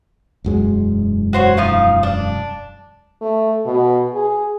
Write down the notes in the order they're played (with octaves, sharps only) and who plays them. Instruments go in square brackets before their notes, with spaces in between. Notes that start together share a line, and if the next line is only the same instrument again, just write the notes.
[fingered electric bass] E1 F#2 G#3
[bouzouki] F#4 C5 C#5
F3 D#4 F5
D4
[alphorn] A3
B2
G#4